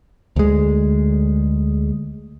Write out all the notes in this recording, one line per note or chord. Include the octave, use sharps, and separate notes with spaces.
D2 G#3